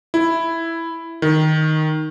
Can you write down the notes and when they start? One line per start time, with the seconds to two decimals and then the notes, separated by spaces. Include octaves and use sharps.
0.14 E4
1.22 D#3